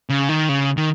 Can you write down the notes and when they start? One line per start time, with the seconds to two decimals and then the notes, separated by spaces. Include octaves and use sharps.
0.09 C#3
0.29 D#3
0.49 C#3
0.77 D#3